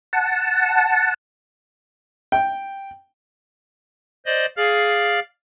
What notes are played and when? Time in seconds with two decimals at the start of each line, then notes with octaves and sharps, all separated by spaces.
0.13 F#5 A5
2.32 G5
4.26 C5 D5 D#5
4.57 G#4 D5 F5 F6